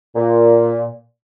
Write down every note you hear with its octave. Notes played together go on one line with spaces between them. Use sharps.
A#2